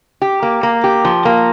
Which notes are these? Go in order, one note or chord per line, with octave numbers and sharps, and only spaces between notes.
G4
A#3
A#3
G4
F3
A#3